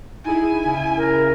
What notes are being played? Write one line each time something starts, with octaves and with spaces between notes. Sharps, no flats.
D#4 E4 G#4 G#5
C#3 E4
A#4